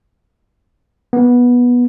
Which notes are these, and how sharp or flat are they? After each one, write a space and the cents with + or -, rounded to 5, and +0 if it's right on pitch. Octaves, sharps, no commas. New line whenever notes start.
B3 -15